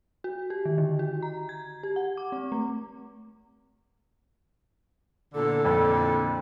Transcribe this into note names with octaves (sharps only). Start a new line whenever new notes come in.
F#4
G4
D#3
D3
F#4
A#5
G#6
G4
F#5
D6
C4
A3
E2 A#2 D3 A4
F2 A4